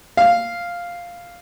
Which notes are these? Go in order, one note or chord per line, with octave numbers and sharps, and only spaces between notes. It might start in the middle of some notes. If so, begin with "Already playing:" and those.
F5